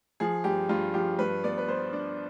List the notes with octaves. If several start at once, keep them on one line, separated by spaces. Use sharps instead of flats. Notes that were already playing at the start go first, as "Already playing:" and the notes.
F3 G#4
G2 G4
G2 F4
F3 G4
G2 B4
B3 D5
B4
B3 C5
D4